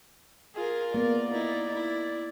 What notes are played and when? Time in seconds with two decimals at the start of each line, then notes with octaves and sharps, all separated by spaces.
0.55 F4 G#4 A#4
0.94 A#3 B3 D5
1.32 D#4 E4
1.74 E4